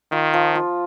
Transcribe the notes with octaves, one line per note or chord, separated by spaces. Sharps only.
D#3 F4
F3
F4